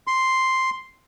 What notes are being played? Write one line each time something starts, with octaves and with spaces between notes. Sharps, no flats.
C6